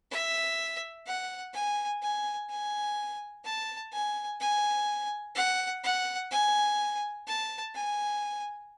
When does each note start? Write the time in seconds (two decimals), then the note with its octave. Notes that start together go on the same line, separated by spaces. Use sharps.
0.11 E5
1.06 F#5
1.53 G#5
2.02 G#5
2.49 G#5
3.44 A5
3.92 G#5
4.40 G#5
5.35 F#5
5.83 F#5
6.31 G#5
7.27 A5
7.74 G#5